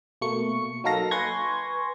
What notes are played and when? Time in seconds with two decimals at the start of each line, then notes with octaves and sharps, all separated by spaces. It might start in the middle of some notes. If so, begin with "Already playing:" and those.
0.21 B2 A3 A#3 C#6 C#7
0.84 F#3 A#3 D#4 A4 F5 A#6
1.11 B4 G#5 C6 C#6 G#6 A#6